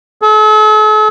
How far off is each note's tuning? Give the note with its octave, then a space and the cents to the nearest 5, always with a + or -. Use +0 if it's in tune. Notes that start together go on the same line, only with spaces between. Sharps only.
A4 -45